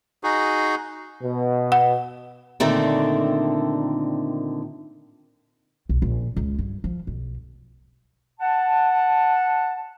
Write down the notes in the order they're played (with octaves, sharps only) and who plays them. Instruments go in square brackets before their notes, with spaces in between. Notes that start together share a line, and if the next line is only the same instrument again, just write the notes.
[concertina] D#4 F#4 G#4
[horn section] B2
[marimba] F#5
[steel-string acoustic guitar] A#2 D3 D#3 A3 C4
[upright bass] B1
A#1
C#2
G2
F3
B1
[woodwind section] F#5 A5